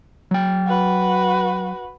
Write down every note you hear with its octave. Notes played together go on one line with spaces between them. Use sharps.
F#3 G5
F#4 B4